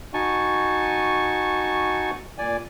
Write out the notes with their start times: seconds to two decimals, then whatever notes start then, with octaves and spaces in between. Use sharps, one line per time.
0.14 D#4 F#4 G#5 A5 C#6
2.38 A#2 D5 G#5